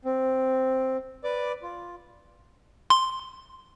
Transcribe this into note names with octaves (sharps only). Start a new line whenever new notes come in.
C4
B4 D5 D6
F4
C6